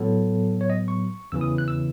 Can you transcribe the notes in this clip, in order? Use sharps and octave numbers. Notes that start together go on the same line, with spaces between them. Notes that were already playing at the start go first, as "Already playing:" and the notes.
Already playing: A2 F#3 B3 A4
C#5
D#5
C#6
E2 C#3 E3 E6
D#6
F#6
E6